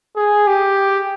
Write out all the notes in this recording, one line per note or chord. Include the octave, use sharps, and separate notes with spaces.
G#4
G4